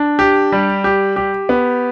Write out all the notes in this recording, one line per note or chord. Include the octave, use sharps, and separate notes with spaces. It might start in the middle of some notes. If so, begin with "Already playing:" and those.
Already playing: D4
G4
G3
G4
G4
B3